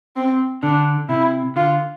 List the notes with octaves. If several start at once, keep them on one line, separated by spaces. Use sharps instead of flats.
C4
D3 D4
C3 E4
D3 F4